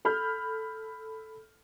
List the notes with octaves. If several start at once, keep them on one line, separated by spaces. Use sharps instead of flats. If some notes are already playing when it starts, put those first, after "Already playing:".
A4 B5 F6 G6